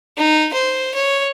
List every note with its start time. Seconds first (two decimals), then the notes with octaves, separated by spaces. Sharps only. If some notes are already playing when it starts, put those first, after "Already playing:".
0.18 D#4
0.54 C5
0.95 C#5